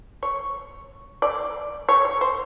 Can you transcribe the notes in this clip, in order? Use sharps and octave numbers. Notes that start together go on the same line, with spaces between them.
C#5
D5
C#5
C#5
C5